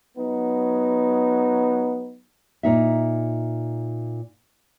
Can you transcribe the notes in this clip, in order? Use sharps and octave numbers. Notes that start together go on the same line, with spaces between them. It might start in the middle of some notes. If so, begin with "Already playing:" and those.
F#3 B3 D#4
A#2 D#4 E5